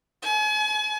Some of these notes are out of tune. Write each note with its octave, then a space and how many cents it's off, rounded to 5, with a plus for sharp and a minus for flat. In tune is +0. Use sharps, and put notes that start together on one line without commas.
G#5 +40